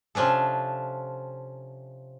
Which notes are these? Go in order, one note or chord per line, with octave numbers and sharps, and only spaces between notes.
C3 F3 C#4 D4 A4